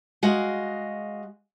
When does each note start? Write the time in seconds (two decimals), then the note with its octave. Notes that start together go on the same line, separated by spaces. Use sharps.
0.23 G#3 F#4 D#5 F5